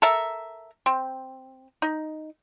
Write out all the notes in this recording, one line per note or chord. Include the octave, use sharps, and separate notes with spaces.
A4 A#4 E5
C4
D#4